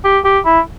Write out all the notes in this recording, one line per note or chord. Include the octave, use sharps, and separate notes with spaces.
G4
G4
E4